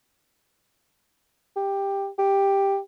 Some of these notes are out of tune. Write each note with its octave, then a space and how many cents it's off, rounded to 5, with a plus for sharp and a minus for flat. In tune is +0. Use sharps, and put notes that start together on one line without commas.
G4 +10
G4 +5